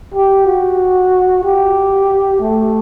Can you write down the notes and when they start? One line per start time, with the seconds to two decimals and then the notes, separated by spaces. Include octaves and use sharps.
0.14 G4
0.47 F#4
1.44 G4
2.41 A3